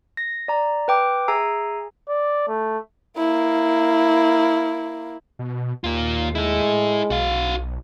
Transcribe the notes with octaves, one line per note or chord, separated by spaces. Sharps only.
A#6
D5 A#5
B4 G5 D6
G#4 E5 G#5 A#5 E6 C7
D5
A3
A#3 E4
B2
D#2 A#3 F4
G#3 E4 A4
B1 F#4 F5